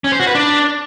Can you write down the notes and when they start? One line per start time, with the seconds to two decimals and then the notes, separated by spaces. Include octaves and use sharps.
0.04 C#4
0.12 C5
0.20 F#4
0.27 B4
0.35 D4